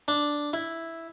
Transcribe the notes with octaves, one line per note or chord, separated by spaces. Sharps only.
D4
E4